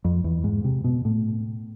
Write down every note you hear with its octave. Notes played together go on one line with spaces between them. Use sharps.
F2
E2
G#2
C3
B2
A2